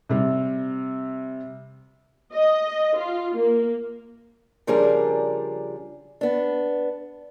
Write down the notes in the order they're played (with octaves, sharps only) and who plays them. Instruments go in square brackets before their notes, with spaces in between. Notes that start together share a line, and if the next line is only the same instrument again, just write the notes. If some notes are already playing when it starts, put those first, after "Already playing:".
[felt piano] C3 G3
[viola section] D#5
F4
A#3
[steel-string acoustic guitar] C#3 F3 G3 D4 G#4 A#4
B3 D4